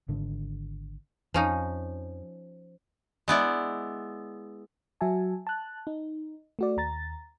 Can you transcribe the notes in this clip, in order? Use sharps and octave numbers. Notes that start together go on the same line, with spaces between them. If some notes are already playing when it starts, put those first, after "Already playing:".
G#1 D3
F2 F3 C#4 D#4
G#3 B3 E4 D5
F#3 F#4 E5 G#5 A5
A5 F#6
D#4
A3 F#4 D5
D#2 A#5 A6